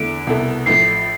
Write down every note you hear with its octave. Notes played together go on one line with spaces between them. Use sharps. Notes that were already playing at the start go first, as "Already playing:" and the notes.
Already playing: E2 D3 A3 D7
C2 B2 B3 E4 A4
A1 A2 F3 A3 C7